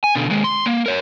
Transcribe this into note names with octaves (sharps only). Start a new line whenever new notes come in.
G#5
B2 D3
D#2 G#3
C6
A#3
A#4 C#5